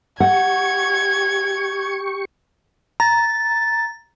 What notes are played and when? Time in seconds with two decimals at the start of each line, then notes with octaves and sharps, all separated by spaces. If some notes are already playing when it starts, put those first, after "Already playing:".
0.20 G4 F#5 C#6 G#6
3.00 A#5 A6